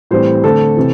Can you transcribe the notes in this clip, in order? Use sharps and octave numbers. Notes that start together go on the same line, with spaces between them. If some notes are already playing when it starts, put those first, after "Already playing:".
A2 E3 G3 C4 C5
D3 A3 C4 A4
C3 E3